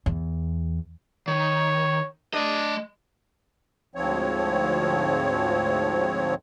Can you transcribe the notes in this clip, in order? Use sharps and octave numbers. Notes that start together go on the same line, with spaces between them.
E2
D#3 C#5
A3 D4 D#5
D2 G#2 F3 C4 C#5